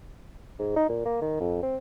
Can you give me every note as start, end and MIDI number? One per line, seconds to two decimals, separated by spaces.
0.59 0.72 44
0.76 0.85 63
0.89 1.03 46
1.05 1.17 58
1.21 1.38 51
1.40 1.58 41
1.63 1.77 60